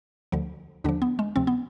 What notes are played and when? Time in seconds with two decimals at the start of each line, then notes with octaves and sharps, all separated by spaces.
0.32 D2 D3 F3
0.84 D#2 D3 F3 D4
1.02 B3
1.19 G#3
1.36 D2 C3 F3 C4
1.47 B3